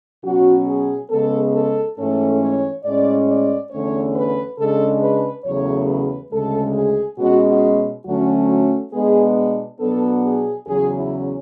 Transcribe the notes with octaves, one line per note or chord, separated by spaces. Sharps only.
B2 F#3 C#4 F#4
G#4
C#3 G#3 B3 A4
A4
G#2 E3 A3 C#4 A4
C#5
A2 G#3 C#4 D5
D5
E2 D3 A3 C#4 C#5
B4
C#3 G#3 D4 A4
B4
E2 C#3 F#3 A3 C#5
B4
D2 C#3 G#3 A4
G#4
B2 G#3 C#4 F#4
F#4
D2 D3 F#3 A3 C#4 F#4
F#4
B2 G#3 B3 D4 G#4
B2 F#3 B3 D4 A4
G#4
E2 C#3 F#3 C#4 G#4
E4